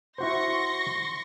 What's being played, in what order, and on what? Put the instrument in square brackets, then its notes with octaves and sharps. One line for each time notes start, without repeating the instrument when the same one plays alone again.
[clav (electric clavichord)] E4 F#4 C5 [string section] C6 C#6 A#6